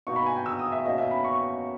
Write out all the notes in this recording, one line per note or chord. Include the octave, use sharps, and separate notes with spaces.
B2 A#3 D#4 C#6
B5
G#5
G5
E6
D#6
E5
B2 A#3 C#4 G4 D#5
E5
B5
C#6